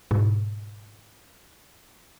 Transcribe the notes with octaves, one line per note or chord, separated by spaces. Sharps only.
G#2 B2